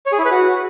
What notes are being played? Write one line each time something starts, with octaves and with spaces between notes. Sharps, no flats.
C#5
G#4
E4
B4
F#4